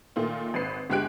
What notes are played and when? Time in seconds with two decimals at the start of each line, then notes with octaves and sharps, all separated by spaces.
0.16 A#2 D#3 A3 F4
0.54 G#1 B4 C7
0.90 G1 G#3 G4 G#5 F#6 D7